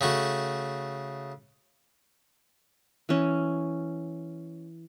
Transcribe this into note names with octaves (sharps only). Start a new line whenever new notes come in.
C#3 A3 F#4
E3 C#4